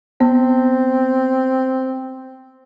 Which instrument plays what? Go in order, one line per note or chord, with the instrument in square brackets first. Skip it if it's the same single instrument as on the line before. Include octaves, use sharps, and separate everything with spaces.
[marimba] B3 [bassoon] C4